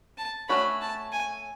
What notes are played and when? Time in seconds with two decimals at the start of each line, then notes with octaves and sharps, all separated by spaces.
0.18 A5
0.49 A3 C#4 F#4 C#5 B5
0.81 A5
1.12 G#5